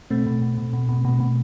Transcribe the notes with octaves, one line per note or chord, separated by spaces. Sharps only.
B2 A3 C4
B2
B2
B2
B2
B2
B2
B2